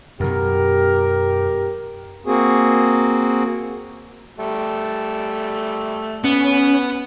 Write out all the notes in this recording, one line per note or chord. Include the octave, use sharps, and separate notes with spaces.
F#2 B2 G4 A#4
A#3 C4 F#4 G#4
G3 A3
B3 C#4